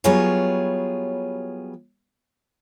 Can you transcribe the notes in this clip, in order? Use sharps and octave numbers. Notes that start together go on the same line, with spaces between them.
F#3 G3 B3 F4 G#4 C#5